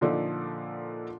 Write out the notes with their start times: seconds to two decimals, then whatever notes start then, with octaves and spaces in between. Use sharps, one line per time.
0.01 A#2 D3 F3 D4 D#4 A4